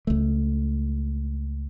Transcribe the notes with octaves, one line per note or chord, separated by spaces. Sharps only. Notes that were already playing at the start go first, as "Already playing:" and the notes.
C#2 A3